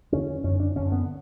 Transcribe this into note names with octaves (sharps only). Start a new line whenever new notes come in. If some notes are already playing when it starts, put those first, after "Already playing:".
E2 D3 C#4
F#2 D3 C#4
D4
F#2 D3 C#4
B3